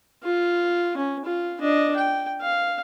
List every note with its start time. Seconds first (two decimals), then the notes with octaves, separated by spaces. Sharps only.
0.23 F4
0.97 C#4
1.25 F4
1.61 D4 D#5
1.96 G5
2.41 F5